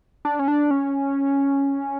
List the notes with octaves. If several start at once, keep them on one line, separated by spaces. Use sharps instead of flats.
D4
C#4
D4
C#4